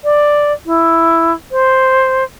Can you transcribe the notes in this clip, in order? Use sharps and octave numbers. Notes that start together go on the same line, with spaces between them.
D5
E4
C5